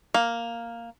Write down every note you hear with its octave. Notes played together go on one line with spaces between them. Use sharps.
A#3